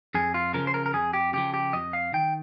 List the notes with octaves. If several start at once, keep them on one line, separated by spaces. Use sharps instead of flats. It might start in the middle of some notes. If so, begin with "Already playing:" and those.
F2 G#4
F4
C#3 F3 A#4
C5
A#4
A#4
F2 G#4
G4
C#3 F3 G4
G4
F2 D#5
F5
D#3 G5